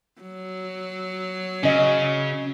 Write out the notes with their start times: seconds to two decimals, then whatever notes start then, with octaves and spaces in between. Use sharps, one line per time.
0.21 F#3
1.63 C#3 C#4 D#5